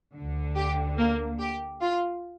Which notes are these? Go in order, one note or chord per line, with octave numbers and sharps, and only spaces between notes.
D2 D3
G4
A#3
G4
F4